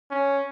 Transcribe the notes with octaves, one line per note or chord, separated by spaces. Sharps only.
C#4